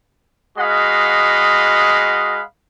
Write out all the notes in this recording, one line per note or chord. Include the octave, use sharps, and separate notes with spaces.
G#3 F#4 D#5 F5 F#5 B5